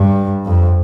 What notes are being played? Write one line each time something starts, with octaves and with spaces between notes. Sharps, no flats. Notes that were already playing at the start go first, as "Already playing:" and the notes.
Already playing: G2
F2